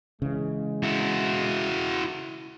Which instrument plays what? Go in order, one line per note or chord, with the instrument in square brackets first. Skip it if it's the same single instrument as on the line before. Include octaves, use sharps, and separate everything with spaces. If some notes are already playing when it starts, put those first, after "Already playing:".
[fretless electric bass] C#3 E3 [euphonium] G#3
[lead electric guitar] E4 F#4